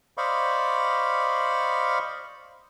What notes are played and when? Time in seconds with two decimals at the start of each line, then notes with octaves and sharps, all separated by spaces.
0.17 C5 D5 D#5 F5 B5 C#6